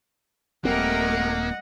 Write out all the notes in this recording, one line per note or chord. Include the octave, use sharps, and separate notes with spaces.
D#1 G3 A3 A#3 C4 A#4 D#5 F#5